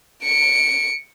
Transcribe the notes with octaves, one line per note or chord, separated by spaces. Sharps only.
C#7 D7